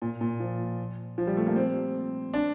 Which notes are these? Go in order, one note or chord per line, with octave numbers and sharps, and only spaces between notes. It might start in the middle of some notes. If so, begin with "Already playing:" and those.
A#2
A#2
F3
F3
G3
A3
A#3
C4
D4